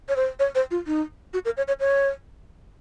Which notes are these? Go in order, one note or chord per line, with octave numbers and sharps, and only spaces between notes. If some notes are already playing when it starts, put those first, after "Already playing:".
C#5
C5
C#5
C5
F4
D#4
F#4
A#4
C#5
C#5
C#5